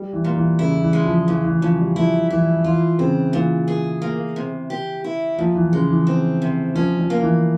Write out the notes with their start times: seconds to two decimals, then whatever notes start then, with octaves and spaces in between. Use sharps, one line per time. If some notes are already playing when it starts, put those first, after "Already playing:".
Already playing: G3
0.13 E3
0.24 A#2
0.36 E3
0.59 C#3 E4
0.81 E3
0.93 G#3
1.04 F3
1.27 C#3 E3
1.45 E3
1.61 C#3 F3
1.79 G3
1.96 F3 E4
2.30 E3 E4
2.64 E3 F4
2.99 C#3 C4
3.33 A#2 E3
3.68 G#4
4.02 A#3
4.36 C3
4.70 G4
5.04 E4
5.38 A#2 F3
5.55 E3
5.73 C#3 G#3
5.90 E3
6.07 C4
6.42 C3
6.75 F3 C#4
6.98 F3
7.10 A#3
7.22 E3